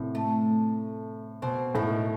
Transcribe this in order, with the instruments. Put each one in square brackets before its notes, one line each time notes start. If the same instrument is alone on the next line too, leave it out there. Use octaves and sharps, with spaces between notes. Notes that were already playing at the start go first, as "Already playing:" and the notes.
Already playing: [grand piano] A2 C3
[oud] A3
[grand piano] B2 [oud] C4
[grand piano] A2 [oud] D#3